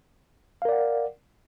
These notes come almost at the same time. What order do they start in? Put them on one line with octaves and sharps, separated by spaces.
F5 A#4 D5 F#5